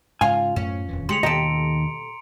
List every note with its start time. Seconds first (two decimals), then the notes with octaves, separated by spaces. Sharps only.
0.21 G#2 C#3 F4 F5 G#5
0.56 F#2 A2 A3 C#4
0.88 D#1 F2 E3
1.09 D3 G#3 G4 C6 C#7 F7
1.23 D#2 B2 G4 A4 D#5 A#5 C6 D7